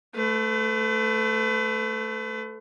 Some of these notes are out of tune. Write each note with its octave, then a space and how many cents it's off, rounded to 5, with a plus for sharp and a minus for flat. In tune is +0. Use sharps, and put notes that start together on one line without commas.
A3 +0 B4 +40